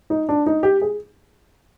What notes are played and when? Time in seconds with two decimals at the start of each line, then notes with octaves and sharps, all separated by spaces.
0.10 D#4
0.29 D4
0.46 D#4
0.63 G4
0.82 G#4